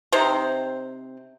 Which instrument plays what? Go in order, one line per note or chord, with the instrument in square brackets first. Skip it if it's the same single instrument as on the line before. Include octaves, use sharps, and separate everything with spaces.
[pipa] C3 C4 D#4 C5